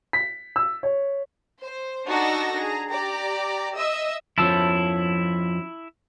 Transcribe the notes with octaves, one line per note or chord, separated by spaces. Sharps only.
B6
E6
C#5
C5
D4 D#4 F#4 A4 A5 A#6
G#4 A#5
G4 D5 A#5
D#5 E5 E6
F2 F3 C#4 E4 A5 E6